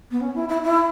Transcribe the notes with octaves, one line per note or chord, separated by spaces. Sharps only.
B3
C#4
E4
E4
E4